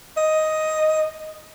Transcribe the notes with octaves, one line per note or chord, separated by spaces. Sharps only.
D#5